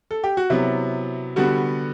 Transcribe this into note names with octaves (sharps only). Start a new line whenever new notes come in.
A4
G4
F#4
C3 F#3 B3 E4
D3 G3 B3 F#4